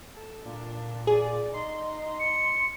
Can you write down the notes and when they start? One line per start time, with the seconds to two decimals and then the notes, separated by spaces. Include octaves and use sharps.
0.15 A4
0.45 A#2 D4
1.07 G#4 D5
1.54 D#4 C6
2.19 C#7